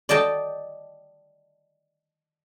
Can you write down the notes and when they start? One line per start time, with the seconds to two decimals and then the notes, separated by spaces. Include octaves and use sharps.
0.09 D5 D#5 G5 A5